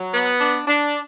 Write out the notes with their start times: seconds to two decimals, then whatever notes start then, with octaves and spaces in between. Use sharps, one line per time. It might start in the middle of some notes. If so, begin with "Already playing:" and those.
Already playing: F#3
0.14 B3
0.41 D4
0.67 D4